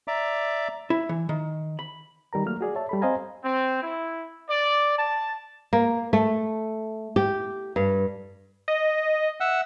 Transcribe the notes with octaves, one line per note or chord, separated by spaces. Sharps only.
D5 E5 A#5 D6
E4
E3
D#3
B5
D#3 G3 A#4 A#5
F#3 A3 A#3 F6
F#4 G#4 D5
C#5 E5 A5
G3 A4 B5
C4 C5 D#5 F5 G#5 A#5
C4
E4
D5
A5
A#3
A3
G4
G2
D#5
E5 F#5 E6